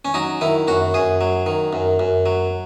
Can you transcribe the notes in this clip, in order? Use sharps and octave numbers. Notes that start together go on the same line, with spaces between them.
C#4
F#3 D#4
D#3 E4
F#2 F#4
F#2 G#4
F#3
D#3
F#2
F#2
F#3